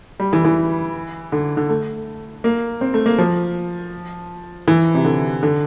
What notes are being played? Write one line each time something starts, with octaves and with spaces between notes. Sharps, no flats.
G3
E3
E3
D3
D3
A3
A#3
C4
A3
A#3
F3
E3
C3
D3
D3